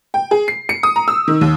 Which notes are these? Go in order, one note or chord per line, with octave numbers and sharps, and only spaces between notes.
G5
G#4
C7
C#7
D#6
A#5
E6
D#3
D#2